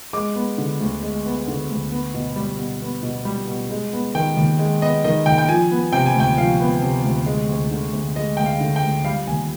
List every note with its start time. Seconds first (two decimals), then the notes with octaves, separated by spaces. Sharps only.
0.13 G#3 D6
0.36 B3
0.58 D3
0.81 D2
1.03 G#3
1.26 B3
1.48 D3
1.70 D2
1.92 B3
2.14 B2
2.36 G3
2.59 B2
2.82 B3
3.03 B2
3.25 G3
3.47 B2
3.71 G#3
3.93 B3
4.15 D#3 G5
4.37 D#2
4.59 G#3
4.82 B3 D#5
5.04 D#3 D#5
5.26 D#2 G5
5.38 G5
5.49 F3 G#5
5.71 B3
5.93 C3 G5
6.06 G#5
6.15 D2 G5
6.37 F3 F5
6.60 B3
6.82 C3
7.04 D2
7.26 G#3
7.49 D2
7.71 D3
7.93 D2
8.16 G#3 D#5
8.37 D2 G5
8.46 F5
8.60 D3
8.76 G5
8.83 D2
9.05 G3 F5
9.27 D#2 G#5